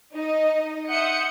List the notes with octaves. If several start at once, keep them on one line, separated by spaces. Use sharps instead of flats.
D#4 D#5
E5 F#5 C6 D#6 G6 C#7